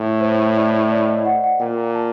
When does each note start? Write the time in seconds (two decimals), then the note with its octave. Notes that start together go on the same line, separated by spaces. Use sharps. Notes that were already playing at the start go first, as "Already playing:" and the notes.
Already playing: A2
0.21 C5
0.56 D5
0.90 D5
1.08 D#5
1.26 F#5
1.44 F#5
1.60 A#2 G5
1.95 A5